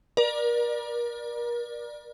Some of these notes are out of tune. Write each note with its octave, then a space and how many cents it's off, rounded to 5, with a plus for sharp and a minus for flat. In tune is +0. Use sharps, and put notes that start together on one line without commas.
A#4 +35 D5 +20